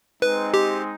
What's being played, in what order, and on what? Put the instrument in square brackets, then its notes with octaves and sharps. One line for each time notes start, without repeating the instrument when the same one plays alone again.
[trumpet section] G#3 C4 D#4 [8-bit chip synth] B4
[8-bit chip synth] G4